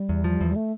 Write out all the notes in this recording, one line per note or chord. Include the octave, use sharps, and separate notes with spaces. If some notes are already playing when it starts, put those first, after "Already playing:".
Already playing: G3
E2
F3
E2
G3
A3